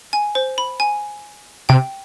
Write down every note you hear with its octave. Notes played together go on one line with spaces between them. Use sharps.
G#5
C5
B5
G#5
C3 G5